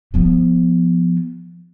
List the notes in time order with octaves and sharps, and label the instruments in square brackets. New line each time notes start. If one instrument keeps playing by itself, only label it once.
[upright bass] F3 B3